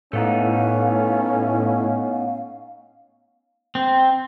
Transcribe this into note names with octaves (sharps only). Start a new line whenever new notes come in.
A2 A3 B3 C#4 D#4 F5
C4